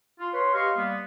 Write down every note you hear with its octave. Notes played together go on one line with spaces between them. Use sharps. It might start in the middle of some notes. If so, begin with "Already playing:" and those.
F4
B4 C#5 C6
G4 D#5 F5 C6 C#6
G3 A#3 B3